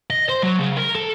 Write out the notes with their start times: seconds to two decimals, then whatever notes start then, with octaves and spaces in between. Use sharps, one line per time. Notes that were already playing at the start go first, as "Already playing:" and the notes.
0.10 D#5
0.29 C5
0.43 F#3
0.59 C#3
0.77 A#4
0.95 A4